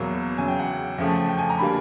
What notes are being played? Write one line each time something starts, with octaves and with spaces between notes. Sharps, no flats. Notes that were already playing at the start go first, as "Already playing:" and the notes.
Already playing: E2 B2 F#3 A#3
E2 C#3 F#3 G#5
G5
F#5
F2 C#3 F3 A3
G5
G#5
A#5
D3 G3 A#3 B5